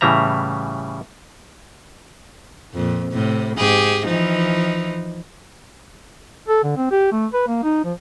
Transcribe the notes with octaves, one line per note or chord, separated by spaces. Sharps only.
A2 C#3 E3 G3 E5 A#5
F2 A#2
A2 C3
G#2 G4 G#4
E3 F3 D#4
A4
D3
C4
G4
A3
B4
A#3
D#4
F3